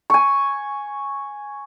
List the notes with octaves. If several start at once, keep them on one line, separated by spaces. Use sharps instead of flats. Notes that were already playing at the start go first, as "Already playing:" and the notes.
G#5 C#6